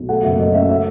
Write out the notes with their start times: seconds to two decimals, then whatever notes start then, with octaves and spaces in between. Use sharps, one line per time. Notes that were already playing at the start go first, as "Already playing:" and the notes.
Already playing: B1
0.09 A3 F#5
0.23 F#1 E5
0.39 F#2 D#5
0.54 A3 E5
0.69 E5